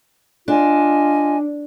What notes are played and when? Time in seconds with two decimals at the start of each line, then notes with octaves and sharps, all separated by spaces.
0.48 D4 F4 D#5 G#5